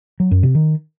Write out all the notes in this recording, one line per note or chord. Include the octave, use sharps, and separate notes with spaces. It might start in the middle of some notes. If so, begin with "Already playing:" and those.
F#3
F#2
C3
D#3